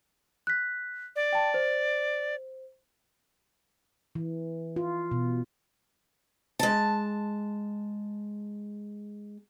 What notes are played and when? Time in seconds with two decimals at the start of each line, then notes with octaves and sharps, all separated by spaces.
0.47 F#6 B6
1.16 D5
1.33 G5 A5
1.54 C5
4.15 E3
4.76 F4
5.11 B2
6.59 G#3 A5